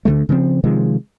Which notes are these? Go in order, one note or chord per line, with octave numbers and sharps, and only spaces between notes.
D2 D3 G3 A3
C#3 F3 A3 C4
C3 D#3 F3 G#3